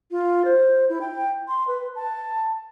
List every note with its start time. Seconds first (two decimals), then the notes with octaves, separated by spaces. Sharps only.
0.11 F4
0.45 C5
0.89 E4
1.01 G5
1.48 C6
1.68 B4
1.96 A5